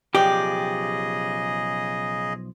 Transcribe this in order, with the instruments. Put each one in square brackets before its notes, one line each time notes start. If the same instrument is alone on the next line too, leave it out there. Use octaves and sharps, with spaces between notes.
[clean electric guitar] B1 F3 [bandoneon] C#3 G#4 D#5 [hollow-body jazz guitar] G4 [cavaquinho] D5 G5